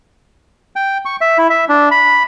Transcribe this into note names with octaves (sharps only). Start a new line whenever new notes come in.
G5
C#6
E5
E4
E5
D4
B5